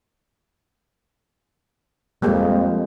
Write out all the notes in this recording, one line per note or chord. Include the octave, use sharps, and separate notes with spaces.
F2 G3 G#3 A#3